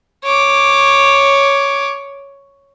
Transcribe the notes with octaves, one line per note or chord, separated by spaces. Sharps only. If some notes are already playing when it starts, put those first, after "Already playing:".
C#5 D6